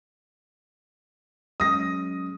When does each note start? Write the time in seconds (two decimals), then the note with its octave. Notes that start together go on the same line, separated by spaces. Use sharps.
1.60 F#3 G#3 C#4 D#6 A#6